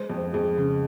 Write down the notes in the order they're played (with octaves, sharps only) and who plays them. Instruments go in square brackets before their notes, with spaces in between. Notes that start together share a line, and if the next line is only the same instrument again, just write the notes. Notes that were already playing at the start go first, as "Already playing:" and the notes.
Already playing: [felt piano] G#3 [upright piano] C5
[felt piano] F2
[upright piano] C5
[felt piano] F2 [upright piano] G#4
[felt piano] C#3